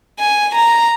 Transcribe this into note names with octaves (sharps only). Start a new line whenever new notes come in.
G#5
A#5